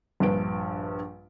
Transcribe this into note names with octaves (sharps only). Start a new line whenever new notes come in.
A#1 G2 B4 D7